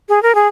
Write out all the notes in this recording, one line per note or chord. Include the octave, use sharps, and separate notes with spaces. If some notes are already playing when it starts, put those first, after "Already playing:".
G#4
A#4
G#4